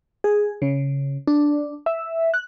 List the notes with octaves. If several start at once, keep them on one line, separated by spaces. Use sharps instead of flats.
G#4
C#3
D4
E5
F#6